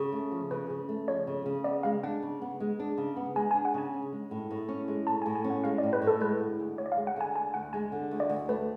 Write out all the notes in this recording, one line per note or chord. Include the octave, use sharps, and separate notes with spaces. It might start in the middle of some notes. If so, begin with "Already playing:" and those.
Already playing: C#3
A3
F3
C#3 B4
C#3
A3
F3 C#5
C#3
C#3
B3 D5
G#3 F5
D4 F#5
C#3
B3
G#3
D4
C#3
B3
G#3 G#5
D4 G#5
F#5
C#3 G#5
C#4
G#3
A2
A2
C#4
G#3
A2 A5
A2 G#5
G#5
C#4
F#5
G#3 F5
A2 D5
B4
A2
A4
G#3 B4
D3
D2
D2 C#5
D5
G#3 F5
F#5
D3 G#5
D2 G#5
D2 F#5
G#3 G#5
D3
D2
D5
D2
A3 B4